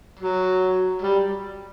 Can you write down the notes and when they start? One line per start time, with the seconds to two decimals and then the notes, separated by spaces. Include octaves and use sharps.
0.19 F#3
1.02 G3